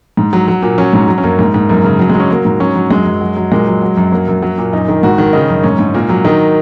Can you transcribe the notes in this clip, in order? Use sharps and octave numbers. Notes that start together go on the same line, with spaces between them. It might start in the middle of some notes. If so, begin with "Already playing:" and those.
G#2
F#3
F#3
A#2
F#3 C#4
G#2
F#3
C#4
F#2 A#3
G#2 A#3
G#2
F#2 A#3
C#3
F#3
G#3
F#3
C#4
F#3 A#3
G#2
F#3 C#4
F#3
F#2 G#3
F#2
F#3
F#3
A#2 G#3
F#3
F#3
F#2
F#3 A#3
F#2
F#3
A#2
F#2 D#4
D#3
G#2 F#4
D#3
C#3 D#4
F#2
G#2 C#4
G#2
A#2 A#3
F#3
D#3 D#4